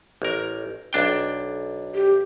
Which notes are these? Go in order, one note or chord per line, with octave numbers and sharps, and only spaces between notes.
A1 A#4
B1 D4 G5
G4